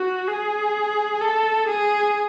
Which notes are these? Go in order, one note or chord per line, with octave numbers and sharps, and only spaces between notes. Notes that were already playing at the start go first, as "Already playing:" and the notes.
Already playing: F#4
G#4
A4
G#4